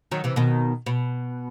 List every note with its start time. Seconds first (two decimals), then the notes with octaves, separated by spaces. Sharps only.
0.11 D#3 F#3
0.24 C3 E3
0.36 B2 D#3
0.86 B2